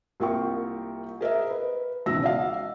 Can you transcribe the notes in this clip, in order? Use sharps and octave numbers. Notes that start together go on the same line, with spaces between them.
C2 A#3 F4 A#4 G5 C#6
G#4 A#4 D#5 E5
B4
G#1 C#2 B2 E3 E6 A#6
D5 D#5 F5